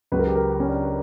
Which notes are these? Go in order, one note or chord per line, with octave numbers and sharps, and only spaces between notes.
C#2 C#3 F#3 B4
A#4
G4
A#4
C#4
D4